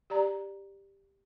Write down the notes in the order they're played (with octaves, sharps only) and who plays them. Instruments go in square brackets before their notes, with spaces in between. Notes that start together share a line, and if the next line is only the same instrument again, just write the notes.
[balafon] G4 D5 A#5